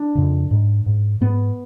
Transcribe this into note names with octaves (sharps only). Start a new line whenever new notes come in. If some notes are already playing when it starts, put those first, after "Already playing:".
Already playing: D4
F2 C#3
G#2
G#2
G#2 B3